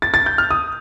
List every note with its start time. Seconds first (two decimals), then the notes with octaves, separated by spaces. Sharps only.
0.02 A6
0.14 A6
0.26 G6
0.38 F6
0.51 D#6